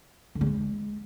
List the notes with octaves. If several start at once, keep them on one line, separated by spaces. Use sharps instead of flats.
D3
G3
G#3